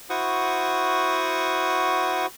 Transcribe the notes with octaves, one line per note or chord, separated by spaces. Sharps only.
E4 F#4 C5 F#5 C#6 D#6